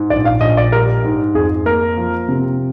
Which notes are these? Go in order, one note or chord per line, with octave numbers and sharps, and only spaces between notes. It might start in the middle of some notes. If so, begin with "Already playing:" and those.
Already playing: G#2
A#1 D5
F5
A#1 D#5
D5
G3 A#4
G#2
F2 G#4
A#3 A#4
F3
C3